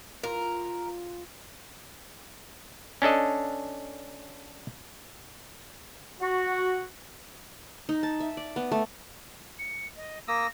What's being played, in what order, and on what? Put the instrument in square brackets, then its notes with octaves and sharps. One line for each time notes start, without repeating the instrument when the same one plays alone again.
[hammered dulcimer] F4 [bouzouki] A#4
[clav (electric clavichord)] C#4 D4 A4 D#5
[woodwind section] F#4
[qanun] D#4
A5
E5
D5
B3
A3
[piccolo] C#7
D#5
[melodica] A#3 D#6 E6 [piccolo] A#6